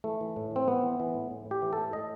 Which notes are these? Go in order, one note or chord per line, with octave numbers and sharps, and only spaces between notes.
E3 A3
E3
A2
E3 C4
E3 B3
E3
E3
A2
A2
A2
G4
E3
A4
A2
A2 D#5